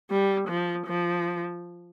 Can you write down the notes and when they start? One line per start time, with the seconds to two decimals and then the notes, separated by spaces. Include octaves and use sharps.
0.10 G3
0.48 F3
0.87 F3